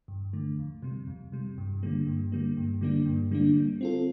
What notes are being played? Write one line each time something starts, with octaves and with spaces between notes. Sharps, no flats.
G2
D3 A3
F2
C3 G3
F2
C3 G3
G2
D3 G3 A#3
G2
D3 G3 A#3
G2
D3 G3 A#3 D4
G2
D3 G3 A#3 D4
G3
C4 F4 A4